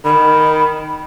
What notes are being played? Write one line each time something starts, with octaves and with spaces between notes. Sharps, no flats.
D#3 B5